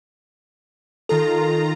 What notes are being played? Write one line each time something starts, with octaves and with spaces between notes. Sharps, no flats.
D#3 F4 A4 A#5